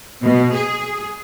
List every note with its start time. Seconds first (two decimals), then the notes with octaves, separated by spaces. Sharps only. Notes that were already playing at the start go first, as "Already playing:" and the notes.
0.22 B2
0.55 G#4